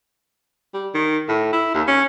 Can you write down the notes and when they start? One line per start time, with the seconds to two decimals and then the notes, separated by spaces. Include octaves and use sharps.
0.74 G3
0.94 D#3
1.29 A2
1.53 E4
1.74 D#2
1.88 C#4